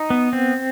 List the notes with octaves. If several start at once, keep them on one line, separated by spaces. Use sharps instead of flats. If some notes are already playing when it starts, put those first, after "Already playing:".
Already playing: D#4
B3
C4